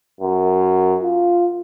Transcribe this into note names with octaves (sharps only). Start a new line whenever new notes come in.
F#2
F4